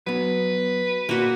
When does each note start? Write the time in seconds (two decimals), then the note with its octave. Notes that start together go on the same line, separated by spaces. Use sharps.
0.07 F#3 B3 B4
1.09 A#2 A#3 F#4